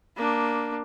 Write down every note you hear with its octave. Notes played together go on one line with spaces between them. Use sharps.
A#3 D4